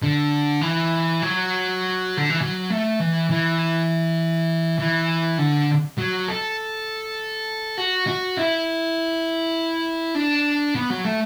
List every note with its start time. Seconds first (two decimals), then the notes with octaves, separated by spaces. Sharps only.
0.02 D3
0.61 E3
1.22 F#3
2.17 D3
2.30 E3
2.41 F#3
2.70 A3
3.00 E3
3.30 E3
4.79 E3
5.38 D3
5.98 F#3
6.28 A4
7.78 F#4
8.07 F#4
8.37 E4
10.15 D4
10.75 B3
10.90 F#3
11.04 A3